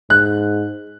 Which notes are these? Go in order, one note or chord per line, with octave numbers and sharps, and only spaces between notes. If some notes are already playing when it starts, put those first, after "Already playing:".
G#2 F#6